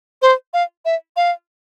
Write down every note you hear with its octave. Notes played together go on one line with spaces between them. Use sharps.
C5
F5
E5
F5